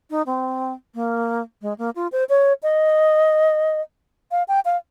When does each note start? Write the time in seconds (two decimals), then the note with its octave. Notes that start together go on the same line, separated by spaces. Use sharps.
0.10 D#4
0.26 C4
0.95 A#3
1.62 G#3
1.78 A#3
1.96 F4
2.12 C5
2.29 C#5
2.63 D#5
4.31 F5
4.48 G5
4.65 F5